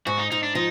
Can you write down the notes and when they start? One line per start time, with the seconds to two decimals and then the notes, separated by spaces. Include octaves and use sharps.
0.06 G#2 F#4
0.18 D#4
0.31 G#2 D#4
0.43 D4
0.55 F3 D#4